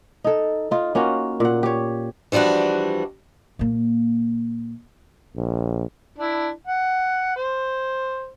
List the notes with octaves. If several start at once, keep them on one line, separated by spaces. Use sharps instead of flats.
D#4 A4
D#4 F4
A#3 C#4 F4 F#4
A#2 F#5
G4 C#5
E3 F3 G3 D4 F#4
A#2 A#3
A#1
D4 E4
F#5
C5